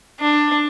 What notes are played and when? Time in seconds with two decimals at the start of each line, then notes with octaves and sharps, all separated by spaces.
0.19 D4